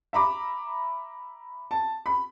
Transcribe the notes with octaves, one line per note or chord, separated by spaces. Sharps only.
E5 A#5 B5 D6
A5
B5